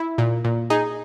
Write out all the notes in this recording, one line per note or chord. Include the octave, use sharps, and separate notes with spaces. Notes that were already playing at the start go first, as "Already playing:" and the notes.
Already playing: E4
A#2
A#2
D#4 G#4